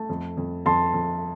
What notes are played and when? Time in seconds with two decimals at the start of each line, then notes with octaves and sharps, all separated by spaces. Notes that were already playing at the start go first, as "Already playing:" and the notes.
Already playing: A3 A5
0.09 F2
0.37 F2
0.66 F2 A5 C6
0.94 F2